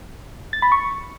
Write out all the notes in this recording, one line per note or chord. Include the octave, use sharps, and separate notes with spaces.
A6
B5
C#6